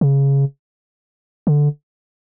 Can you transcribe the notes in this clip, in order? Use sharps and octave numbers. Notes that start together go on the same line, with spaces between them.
C#3
D3